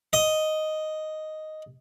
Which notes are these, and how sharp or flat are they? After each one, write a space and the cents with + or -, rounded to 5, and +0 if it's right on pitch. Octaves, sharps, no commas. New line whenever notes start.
D#5 +0